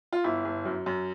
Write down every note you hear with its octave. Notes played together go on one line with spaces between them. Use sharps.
F4
G1 E4
G1
F#2
F#2